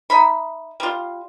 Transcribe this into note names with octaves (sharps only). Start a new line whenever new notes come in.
D#4 E5 B5
G3 F4